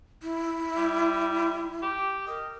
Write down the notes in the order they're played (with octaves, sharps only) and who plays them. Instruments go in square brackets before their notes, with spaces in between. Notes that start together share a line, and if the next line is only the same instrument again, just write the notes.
[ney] E4
[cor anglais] G3
G4
[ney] A#4 [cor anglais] D#5